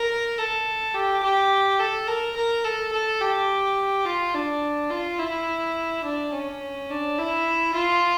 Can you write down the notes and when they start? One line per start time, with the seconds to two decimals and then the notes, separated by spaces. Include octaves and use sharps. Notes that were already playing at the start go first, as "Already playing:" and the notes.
Already playing: A#4
0.38 A4
0.94 G4
1.23 G4
1.79 A4
2.07 A#4
2.36 A#4
2.64 A4
2.92 A4
3.21 G4
4.05 F4
4.34 D4
4.90 F4
5.19 E4
6.04 D4
6.33 C#4
6.90 D4
7.18 E4
7.74 F4